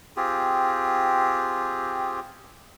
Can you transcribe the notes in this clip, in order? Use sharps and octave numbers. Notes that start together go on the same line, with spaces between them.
C4 F4 G4 G#4